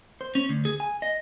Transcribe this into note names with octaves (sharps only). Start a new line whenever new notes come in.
C5
C#4
D2
G#4
G#5
D#5